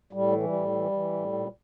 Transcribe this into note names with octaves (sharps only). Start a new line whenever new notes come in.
A2 G3
E3
G3
A2
E3
E3
A2
A#2